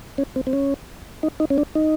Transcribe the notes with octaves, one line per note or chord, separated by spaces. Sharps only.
C#4
C4
C4
C#4
D#4
D#4
C#4
D4
D#4